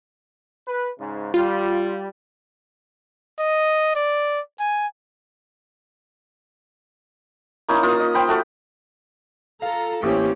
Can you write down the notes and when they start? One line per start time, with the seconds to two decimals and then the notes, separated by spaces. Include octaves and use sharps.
0.67 B4
0.99 G#2 C#3
1.34 G3 F4
3.39 D#5
3.95 D5
4.60 G#5
7.68 A#3 C#4 D#4 E4
7.83 A#3 F4 D#6
8.00 D#5
8.15 C5 G5 B5
8.28 A3 F#4 A4 F5
9.62 F4 A4 F5 A#5
10.03 A1 A#3 C4 C#4 G4